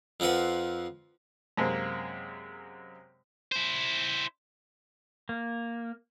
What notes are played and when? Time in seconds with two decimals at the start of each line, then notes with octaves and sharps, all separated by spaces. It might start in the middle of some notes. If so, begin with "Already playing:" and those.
0.20 F2 F3 C4 B4 F#5
1.57 F#2 C3 G#3 A#3 C4
3.52 E4 C5
5.29 A#3